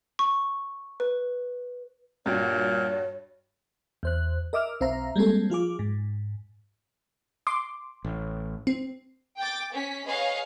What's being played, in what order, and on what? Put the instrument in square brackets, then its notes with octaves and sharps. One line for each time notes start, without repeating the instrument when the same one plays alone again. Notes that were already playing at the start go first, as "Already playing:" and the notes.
[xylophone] C#6
B4
[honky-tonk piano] G2 F#4 G5 [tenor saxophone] A#2 [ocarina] C#5
[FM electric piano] E2 C5 F#6
A#4 D#5 E5 D6 E6 F6
B1 C4 C5 E5 F5 A#5
G3 G#3 A#3 C4 A4
F3 F4 G#4 D6
G#2
[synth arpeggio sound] C6 D6
[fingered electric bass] A1
[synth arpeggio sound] C4
[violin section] G5 D6 A6
C#4 B6
G#4 B4 C#5 D#5 F5